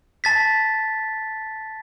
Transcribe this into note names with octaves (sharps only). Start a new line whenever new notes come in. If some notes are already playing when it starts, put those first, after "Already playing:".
A5 A6 B6